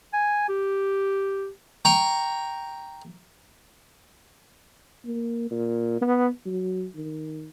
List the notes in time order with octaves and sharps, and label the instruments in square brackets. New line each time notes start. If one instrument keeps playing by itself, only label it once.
[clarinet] G#5
G4
[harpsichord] G5 A#5 C#6
[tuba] A#3
A#2
B3
F#3
D#3